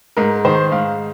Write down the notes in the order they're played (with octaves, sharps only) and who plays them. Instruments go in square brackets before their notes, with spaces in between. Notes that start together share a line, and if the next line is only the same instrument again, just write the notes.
[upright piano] G#2 A#4
D#3 C5
G#2 F5